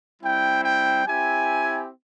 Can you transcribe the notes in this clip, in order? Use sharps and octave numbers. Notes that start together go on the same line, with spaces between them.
G3 C4 E4 G5
G5
C4 E4 G4 G#5